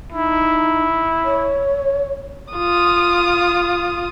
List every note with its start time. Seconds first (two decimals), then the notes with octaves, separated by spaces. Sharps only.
0.12 D#4 E4
1.24 C#5
2.54 F4 D#6